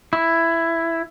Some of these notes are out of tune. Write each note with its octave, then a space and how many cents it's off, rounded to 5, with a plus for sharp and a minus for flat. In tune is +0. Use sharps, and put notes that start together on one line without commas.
E4 +10